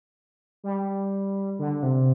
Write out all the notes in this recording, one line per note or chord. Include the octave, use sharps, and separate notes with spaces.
G3
D3
C3